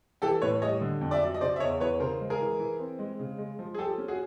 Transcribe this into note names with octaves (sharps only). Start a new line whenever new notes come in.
E3 G4 A4
A2 B4 C#5
G3 C#5 D#5
D3
F2
D5 E5
F#3
D#5
C#3 C5 D5
E5
E2 C#5 D#5
E3 B4 C#5
C#3 A#4 C5
G#3
G#4 A#4
E3
E3
C4
G#3
C#3
G#3
F3
G#4
F3 G4 A4
C#4
F#4 G#4